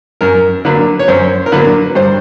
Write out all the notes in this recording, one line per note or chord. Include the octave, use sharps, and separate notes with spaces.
F#2 A#4
D3 F#3 A#3 B4
C#5
F#2 C5
A#4
D3 F#3 A#3 B4
G2 C5